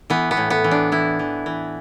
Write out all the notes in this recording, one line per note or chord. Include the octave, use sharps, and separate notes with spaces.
E3 B3
B3
A2
B3
E3
D4
E3 E4
E3
E3